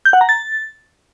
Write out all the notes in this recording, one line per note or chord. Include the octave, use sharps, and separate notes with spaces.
G6
F#5
A#5
A6